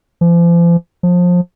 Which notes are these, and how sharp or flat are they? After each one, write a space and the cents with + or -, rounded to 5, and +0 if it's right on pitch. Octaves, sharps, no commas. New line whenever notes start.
F3 -40
F3 +25